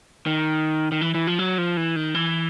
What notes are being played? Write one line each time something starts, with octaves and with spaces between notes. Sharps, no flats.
D#3
D#3
E3
E3
F3
F#3
F3
E3
D#3
E3